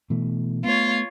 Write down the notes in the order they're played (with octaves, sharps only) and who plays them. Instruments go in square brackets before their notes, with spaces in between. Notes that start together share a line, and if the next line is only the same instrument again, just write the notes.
[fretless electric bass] B2 E3 A3
[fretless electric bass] A3 B3 [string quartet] F4 C#5